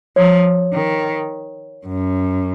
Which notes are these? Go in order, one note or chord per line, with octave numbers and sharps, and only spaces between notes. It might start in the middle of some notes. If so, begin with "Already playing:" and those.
F3 C#5
D#3
F#2